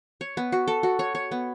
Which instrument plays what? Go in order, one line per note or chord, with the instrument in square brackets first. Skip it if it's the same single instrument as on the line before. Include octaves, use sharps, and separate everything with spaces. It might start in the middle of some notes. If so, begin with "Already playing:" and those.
[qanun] C#5
B3
F#4
A4
F#4
C#5
C#5
B3